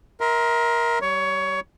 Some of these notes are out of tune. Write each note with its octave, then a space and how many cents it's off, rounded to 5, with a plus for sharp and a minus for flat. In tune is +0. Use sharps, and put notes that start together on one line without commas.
A#4 +15 E5 -35 C6 -10
G3 -25 C#5 +20